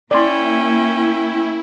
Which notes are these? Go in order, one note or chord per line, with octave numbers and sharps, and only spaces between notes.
A#3 C#4 E4 D5 G5 C6